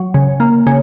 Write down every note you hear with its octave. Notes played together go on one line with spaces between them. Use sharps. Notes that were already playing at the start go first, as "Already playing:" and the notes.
Already playing: F#3
C#3
A#3
C#3